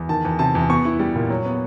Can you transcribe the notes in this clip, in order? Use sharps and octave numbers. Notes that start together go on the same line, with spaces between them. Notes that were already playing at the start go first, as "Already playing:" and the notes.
Already playing: E2
D#3 A5
E2
C3 A5
E2
B3 C#6
E4
G3
A#2
F#3
B3